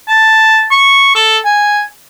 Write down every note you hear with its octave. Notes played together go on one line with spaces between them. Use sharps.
A5
C#6
A4
G#5